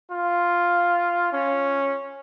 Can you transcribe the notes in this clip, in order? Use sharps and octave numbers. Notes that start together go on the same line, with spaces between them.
F4
C#4